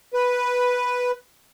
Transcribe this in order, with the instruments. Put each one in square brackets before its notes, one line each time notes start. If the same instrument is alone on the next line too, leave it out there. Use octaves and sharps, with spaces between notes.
[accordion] B4